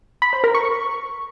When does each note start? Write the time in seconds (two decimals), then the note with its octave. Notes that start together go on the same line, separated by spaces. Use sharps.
0.22 B5
0.33 C5
0.44 A#4
0.55 C#6